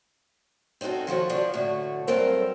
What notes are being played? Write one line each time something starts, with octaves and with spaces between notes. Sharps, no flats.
C4 C#4 D#4 F#4 A4
D#3 F3 F#4 C#5
F3 C#4 D4
A2 D3 F#4
G2 F#3 C4 A4 A#4 C5